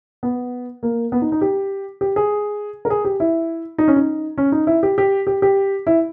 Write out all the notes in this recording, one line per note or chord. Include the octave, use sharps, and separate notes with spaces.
B3
A#3
B3
D#4
D#4
G4
G4
G#4
A#4
G#4
G4
E4
D#4
C#4
D#4
C#4
D#4
E4
G4
G4
G4
G4
E4